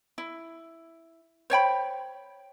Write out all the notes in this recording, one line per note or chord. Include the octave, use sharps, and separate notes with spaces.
E4
C5 C#5 G5 B5